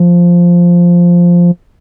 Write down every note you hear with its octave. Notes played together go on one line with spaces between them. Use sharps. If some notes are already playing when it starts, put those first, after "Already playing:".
Already playing: F3